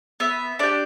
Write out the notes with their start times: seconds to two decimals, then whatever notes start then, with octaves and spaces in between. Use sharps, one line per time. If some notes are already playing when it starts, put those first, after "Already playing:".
0.20 B3 E5
0.59 D4 G4 D5